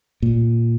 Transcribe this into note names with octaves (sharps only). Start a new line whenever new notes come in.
A#2